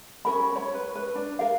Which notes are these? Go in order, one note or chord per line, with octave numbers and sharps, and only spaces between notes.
C#4 A#4 B5
C#5 B5
B4
B4
D4
A#4 F5